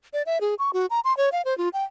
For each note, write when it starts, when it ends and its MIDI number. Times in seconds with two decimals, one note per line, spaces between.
0.14 0.23 74
0.26 0.38 76
0.41 0.55 68
0.59 0.71 85
0.73 0.86 66
0.90 1.00 82
1.05 1.16 84
1.17 1.29 73
1.32 1.42 77
1.45 1.57 72
1.58 1.69 65
1.73 1.84 79